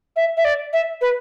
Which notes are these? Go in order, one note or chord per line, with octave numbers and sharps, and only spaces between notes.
E5
E5
D5
E5
B4